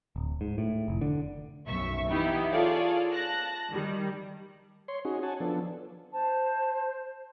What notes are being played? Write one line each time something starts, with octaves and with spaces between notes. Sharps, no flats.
D1
G#2
A2
F1
D3
B1 F#2 E5 C#6
E3 B3 D#4 E4 G4
F4 G#4 A4 C#5 D5 F5
A5 F#6 A#6
D#3 G3
C#5 C6
C#4 D#4 F#4 G#4
C#5 F#5 G#5 A5
F3 B3 D4 A4
C5 A5